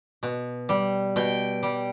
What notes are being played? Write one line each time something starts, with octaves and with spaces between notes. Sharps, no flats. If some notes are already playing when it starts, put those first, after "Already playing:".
B2
G3
B2 G5
G3